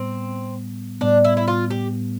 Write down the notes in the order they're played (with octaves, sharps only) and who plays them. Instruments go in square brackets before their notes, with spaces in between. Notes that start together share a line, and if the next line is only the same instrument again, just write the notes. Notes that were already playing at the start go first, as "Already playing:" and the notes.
Already playing: [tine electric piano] A2 G3 B3 [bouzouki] C4
[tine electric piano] A2 G3 B3 [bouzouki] D4
[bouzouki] E4
E4
F4
G4